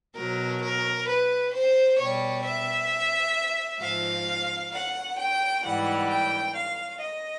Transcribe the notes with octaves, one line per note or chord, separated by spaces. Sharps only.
B2 F#3 A#4
A#4
B4
C5
B2 G3 C#5
E5
G#2 F3 F5
F#5
G5
G#2 E3 G3 F#5
G5
F5
D#5